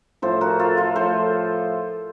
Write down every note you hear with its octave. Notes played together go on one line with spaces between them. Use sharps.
A2 F3 A3 A4 C5
F#4 A#4
F4 A4
F4 A4
A2 F3 A3 A4 C5